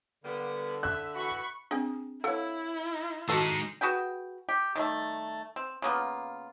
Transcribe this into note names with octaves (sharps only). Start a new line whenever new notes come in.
D3 G3 A#3 B3
E5 F#6
E3 F#4 B5 C#6
C4 D4 G#4 G5
E4 A4 C#5 F5 F#5
D#3 G#3 D#4 F#4 A4 A5
F#4 G#4 B4 G5
G4
D#3 G3 A3
C4
C#3 A#3 B3 F4